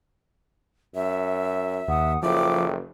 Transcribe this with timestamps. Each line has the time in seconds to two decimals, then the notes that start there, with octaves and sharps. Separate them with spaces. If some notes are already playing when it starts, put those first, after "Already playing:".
0.95 F#2 E5
1.88 D#2 F#5 D#6
2.22 F#1 F3 A4 E5 G5 D6